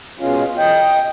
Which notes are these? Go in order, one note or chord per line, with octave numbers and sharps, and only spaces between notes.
B2 G#3 C#4 F4
D#5 G5